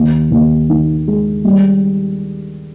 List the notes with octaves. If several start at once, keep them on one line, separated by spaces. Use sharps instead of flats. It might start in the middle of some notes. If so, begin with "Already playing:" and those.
Already playing: D#2
D#2
D#3
G#3
G3